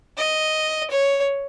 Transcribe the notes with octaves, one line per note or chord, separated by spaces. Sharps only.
D#5
C#5